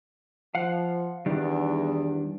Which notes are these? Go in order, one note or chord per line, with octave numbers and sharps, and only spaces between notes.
F3 F5 F#5
E2 D#3 G3 D4